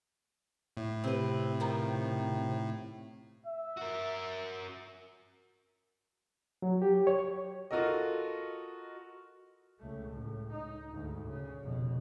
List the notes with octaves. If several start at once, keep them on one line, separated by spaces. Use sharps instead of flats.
A2
C3 C4 B4
D#3 F3
E5
F#4 A#4
F#3
G4
C#5
F4 F#4 A4 A#4 D#5
C#2 A3
C#2 A2
D#4
D2 G#2
C#3
F1 B2